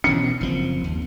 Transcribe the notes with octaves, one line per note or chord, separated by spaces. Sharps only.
B2 E3 C#4 C#7
F#1 F3 C4
D#2